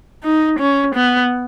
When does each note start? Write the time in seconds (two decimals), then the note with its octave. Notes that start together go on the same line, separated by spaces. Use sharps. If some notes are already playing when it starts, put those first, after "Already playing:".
0.24 D#4
0.59 C#4
0.95 B3